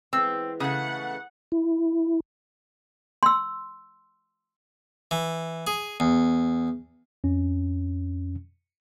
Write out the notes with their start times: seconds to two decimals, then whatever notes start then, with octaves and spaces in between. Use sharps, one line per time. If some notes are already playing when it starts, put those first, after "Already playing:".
0.13 E3 G#3 B3 C4 E6
0.60 C#3 A3 F#5 D#6
1.52 E4
3.23 C6 E6
5.11 E3
5.67 G#4
6.00 E2
7.24 F2 C#4